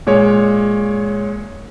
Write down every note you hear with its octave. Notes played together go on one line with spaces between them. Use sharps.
A#2 G#3 C#5